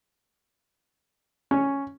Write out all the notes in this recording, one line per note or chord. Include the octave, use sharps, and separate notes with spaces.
C#4